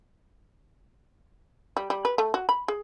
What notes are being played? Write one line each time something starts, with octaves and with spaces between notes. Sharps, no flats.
G3
G3
B4
A3
F#4
B5
G#4